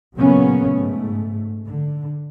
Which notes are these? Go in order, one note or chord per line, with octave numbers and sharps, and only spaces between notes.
A#2 C#3 F#3 A#3 B3 C#4
G#2 A3
D3